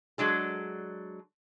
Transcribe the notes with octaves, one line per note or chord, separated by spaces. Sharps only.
F#3 G#3 D4 A4